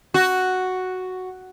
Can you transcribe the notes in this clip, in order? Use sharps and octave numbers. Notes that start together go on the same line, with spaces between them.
F#4